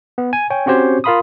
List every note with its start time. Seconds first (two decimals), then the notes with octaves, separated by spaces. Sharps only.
0.18 B3
0.33 G#5
0.50 C#5 G5 G#5
0.66 C4 C#4 F#4 G4 C5 C#5
1.04 F4 A#4 F5 B5 C6 D#6